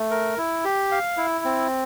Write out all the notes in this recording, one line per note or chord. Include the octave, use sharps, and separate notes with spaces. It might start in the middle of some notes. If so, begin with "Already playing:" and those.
Already playing: A3
A#4
E4
G4
F5
E4
C4